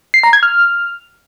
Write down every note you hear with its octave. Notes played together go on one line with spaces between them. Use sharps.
C7
A#5
G#6
F6